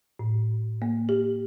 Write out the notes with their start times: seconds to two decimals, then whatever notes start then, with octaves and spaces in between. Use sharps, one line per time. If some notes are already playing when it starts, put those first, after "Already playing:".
0.19 A2
0.82 A#3
1.09 G4